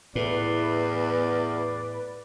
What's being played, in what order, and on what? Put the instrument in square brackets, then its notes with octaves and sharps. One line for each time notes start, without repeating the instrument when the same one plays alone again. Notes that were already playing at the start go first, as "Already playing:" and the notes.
[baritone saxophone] E2 [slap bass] A2 [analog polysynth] B4 [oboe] D5